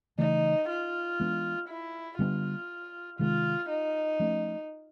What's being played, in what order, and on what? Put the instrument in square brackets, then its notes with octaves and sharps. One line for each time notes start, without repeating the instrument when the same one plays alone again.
[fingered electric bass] C#3 E3 A3 [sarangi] D#4
[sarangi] F4
[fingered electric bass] E3 G#3 B3 D4
[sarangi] E4
[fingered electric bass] D3 G3 B3 D4 [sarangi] F4
[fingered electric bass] C3 D#3 G#3 [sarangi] F4
[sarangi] D#4
[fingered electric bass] F3 A3 C#4